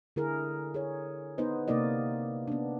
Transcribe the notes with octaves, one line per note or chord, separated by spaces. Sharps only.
D3 E4 G#4 A#4
G#4 C#5
B3 D#4 B4 C5 D#5
C3 A#3 D#4 A#4 D5 D#5
B3 D4